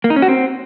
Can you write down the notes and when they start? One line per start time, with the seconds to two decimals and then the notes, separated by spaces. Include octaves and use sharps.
0.04 A#3
0.10 D#4
0.16 C#4
0.22 F#4
0.28 C4